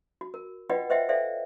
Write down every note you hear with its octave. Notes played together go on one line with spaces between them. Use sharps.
F#4
A#4
F4 B4 D5 D#5 F#5 G5
B4 C5 D#5 E5 F#5 G5
A4 C5 D5 E5 F5